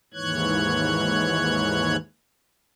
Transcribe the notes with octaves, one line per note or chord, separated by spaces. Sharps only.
D#2 G#2 E3 C#5 F#6 G#6